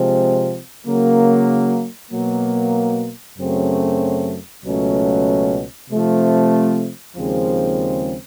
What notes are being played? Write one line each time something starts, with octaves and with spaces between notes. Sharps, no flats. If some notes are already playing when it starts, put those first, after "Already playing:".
Already playing: C3 F3 G#3 C4
C#3 F#3 A#3
B2 F#3 A#3
F#2 C#3 F#3 A3 C4
C#2 B2 F#3 A3 C#4
C3 F3 A3 C4
D#2 C#3 F3 G#3 C4